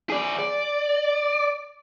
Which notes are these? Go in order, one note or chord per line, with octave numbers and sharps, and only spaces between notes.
G#4 D5
D5